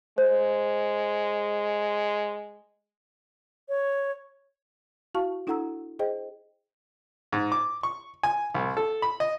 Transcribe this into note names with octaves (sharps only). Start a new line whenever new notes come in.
G#3 C5
C#5
E4 F#4 F5 A5 C#6
D4 E4 A4 F#5 A#5 E6
G#4 C5 D#5 G5
G#2
D6
C#6
G#5
C2
A4
B5
D#5